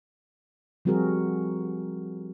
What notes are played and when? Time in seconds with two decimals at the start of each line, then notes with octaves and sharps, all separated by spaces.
0.85 F3 G3 C4 F#4 G#4 A#4